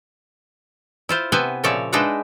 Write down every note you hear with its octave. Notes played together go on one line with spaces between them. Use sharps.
E4 F4 C5
C3 B3 E4 B4 C5 G#5
A#2 C#3 F3 C#5 D5 E5
G#3 D4 D#4 B4 E5 F#5